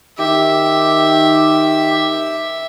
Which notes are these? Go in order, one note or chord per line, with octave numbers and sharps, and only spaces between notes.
D#3 G4 E5